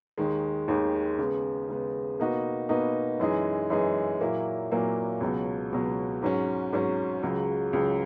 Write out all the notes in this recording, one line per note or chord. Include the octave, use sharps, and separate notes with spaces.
D#2 D#3 G#3
D#2 D#3 G#3
C#3 G#3 B3
C#3 G#3 B3
B2 A#3 D#4 F#4 B4
B2 A#3 D#4 F#4 B4
F#2 E3 G#3 D#4 G#4
F#2 E3 G#3 D#4 G#4
A#2 F#3 A#3 E4
A#2 F#3 A#3 E4
C#2 B2 F#3
C#2 B2 F#3
G#2 F#3 C#4
G#2 F#3 C#4
C#2 C#3 F#3
C#2 C#3 F#3